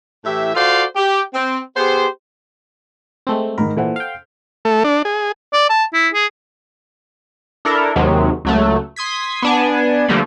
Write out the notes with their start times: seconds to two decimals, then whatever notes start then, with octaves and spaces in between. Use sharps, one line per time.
0.25 A2 E3 G4 E5
0.55 F4 F#4 A4 C5 D5 F5
0.95 G4
1.34 C4
1.76 B3 G4 G#4 C5
3.27 G#3 A3 C4
3.58 G#2 D#3 A#4 B5
3.77 A#2 E3 A4 C5 F#5
3.96 F5 G5
4.65 A3
4.84 D4
5.05 G#4
5.53 D5
5.70 A5
5.94 E4
6.14 G#4
7.65 D4 E4 A4 A#4
7.96 D#2 C3 D#3 F#3 G#3
8.45 C#2 F#3 A3
8.96 C6 D#6 G#6 B6
9.42 B3 D4 G#5
10.08 D3 F3 G3 A3 A#3